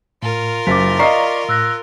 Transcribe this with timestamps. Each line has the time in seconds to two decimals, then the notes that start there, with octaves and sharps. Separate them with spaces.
0.23 A2 F4 A#4
0.67 F#1 F#3 D6 A6 B6
0.99 D5 D#5 F5 A#5 C#6 C7
1.49 A2 E6 F#6 A#6